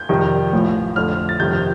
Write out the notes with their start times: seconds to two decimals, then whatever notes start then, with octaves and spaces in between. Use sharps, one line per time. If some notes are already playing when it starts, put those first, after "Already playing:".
Already playing: G6
0.09 F2 C3 D#3 G3
0.53 A1 A2 F3
0.96 F2 D3 A3 F6
1.29 A6
1.40 G1 F2 C3 D#3 G6